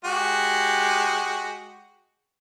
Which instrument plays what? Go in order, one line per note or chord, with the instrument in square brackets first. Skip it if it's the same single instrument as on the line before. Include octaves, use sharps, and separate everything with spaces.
[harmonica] G#3 F#4 G4